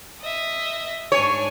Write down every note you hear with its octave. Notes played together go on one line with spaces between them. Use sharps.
D#5 E5
G#2 D4 C#5 G#5